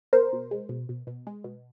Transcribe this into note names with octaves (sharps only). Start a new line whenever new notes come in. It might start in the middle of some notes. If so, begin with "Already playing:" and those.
B2 A#4 C5
B2
G#3
B2
B2
B2
G#3
B2